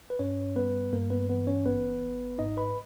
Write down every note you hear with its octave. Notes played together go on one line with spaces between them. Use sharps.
B4
G2 C#4 C#5
G3 B3 B4
G2 A#3 A#4
B3 B4
E3 B3 B4
C#4 C#5
G#1 B3 B4
G#1
G#2 D#4 D#5
B4 B5